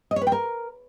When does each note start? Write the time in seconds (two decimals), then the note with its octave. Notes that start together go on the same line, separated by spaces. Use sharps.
0.11 D#5
0.16 C#5
0.21 B4
0.27 G5
0.32 A#4